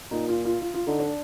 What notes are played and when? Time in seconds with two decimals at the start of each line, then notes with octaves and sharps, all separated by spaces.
0.11 A#2 D#4
0.29 F4
0.45 F4
0.61 F4
0.74 F4
0.87 D3 D#4
1.00 D4